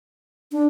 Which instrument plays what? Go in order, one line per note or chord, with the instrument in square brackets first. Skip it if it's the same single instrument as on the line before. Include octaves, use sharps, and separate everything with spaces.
[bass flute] D4